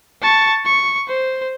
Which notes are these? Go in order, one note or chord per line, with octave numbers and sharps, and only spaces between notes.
A5 C#6
C#6
C5